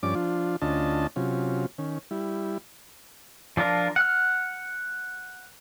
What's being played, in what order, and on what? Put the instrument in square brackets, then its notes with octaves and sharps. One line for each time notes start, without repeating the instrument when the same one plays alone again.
[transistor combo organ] G2 F3 C#4 D5 D6
F3 D4 F4
D2 C#4 D4 F4 D#5 A5
C3 F#3 C#4 F4
D#3 C#4
G3 E4
[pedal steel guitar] F3 D4 F4 A#4
F#5 F6